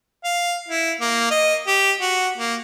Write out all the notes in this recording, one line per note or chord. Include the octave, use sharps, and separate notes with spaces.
F5
E4
A#3
D#5
G4
F#4
A#3